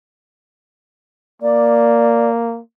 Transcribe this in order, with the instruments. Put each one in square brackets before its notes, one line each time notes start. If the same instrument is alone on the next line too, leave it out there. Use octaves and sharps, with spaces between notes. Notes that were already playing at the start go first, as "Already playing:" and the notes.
[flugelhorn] A#3 [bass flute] D5